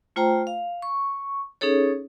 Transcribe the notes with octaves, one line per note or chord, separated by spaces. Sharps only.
A3 F4 C5 G5 A#5
F5
C#6
C#4 D#4 G#4 A4 C#5